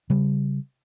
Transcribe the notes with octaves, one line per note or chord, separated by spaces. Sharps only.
C#3 G3